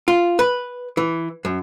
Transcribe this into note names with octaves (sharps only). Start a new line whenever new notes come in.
F4
B4
E3
F#2